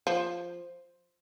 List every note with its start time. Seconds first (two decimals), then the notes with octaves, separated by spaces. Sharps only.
0.07 F3